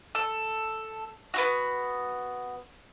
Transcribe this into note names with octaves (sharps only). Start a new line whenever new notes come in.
A4
B3 E4 F#4